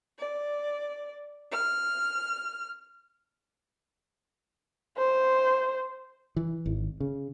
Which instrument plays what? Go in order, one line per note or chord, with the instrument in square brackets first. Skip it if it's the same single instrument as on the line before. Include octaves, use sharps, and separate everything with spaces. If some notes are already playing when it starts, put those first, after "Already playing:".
[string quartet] D5
F6
[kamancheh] C5
[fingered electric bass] E3
G#1
C#3